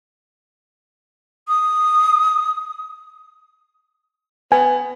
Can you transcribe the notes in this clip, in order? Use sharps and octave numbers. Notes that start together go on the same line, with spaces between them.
D#6
B3 G#5